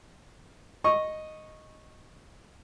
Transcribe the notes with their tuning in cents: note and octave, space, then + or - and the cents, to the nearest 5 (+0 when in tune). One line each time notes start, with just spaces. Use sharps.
D#5 +0 C#6 -15